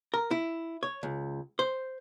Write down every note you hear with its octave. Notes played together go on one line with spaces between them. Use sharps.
A#4
E4
C#5
C#2
C5